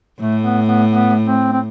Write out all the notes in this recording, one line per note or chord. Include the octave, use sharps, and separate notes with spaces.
A2 A3
B3
B3
B3
C4
C4